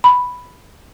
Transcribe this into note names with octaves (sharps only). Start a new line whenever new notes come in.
B5